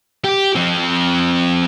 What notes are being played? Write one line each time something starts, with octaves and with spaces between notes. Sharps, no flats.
G4
F3 C4